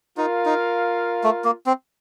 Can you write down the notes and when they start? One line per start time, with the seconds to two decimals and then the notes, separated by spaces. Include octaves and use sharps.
0.17 D#4 F4 A#4 F5
0.46 D#4
1.24 A3
1.45 A#3
1.66 C4